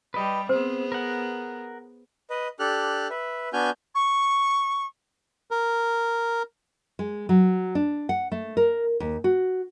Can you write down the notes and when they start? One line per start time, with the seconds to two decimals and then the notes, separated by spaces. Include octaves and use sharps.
0.14 G3 G4 B4 D#5
0.49 B3 C4 G#4 C5
0.92 A#4 F#5
2.30 B4 D#5
2.60 D4 G4 A4 F6 F#6
3.10 B4 E5
3.53 B3 D4 F#4 G#5 F6 G6
3.94 C#6
5.51 A#4
6.99 G#3
7.29 F#3
7.75 D4
8.09 F#5
8.32 A3
8.57 A#4
9.00 D#2
9.24 F#4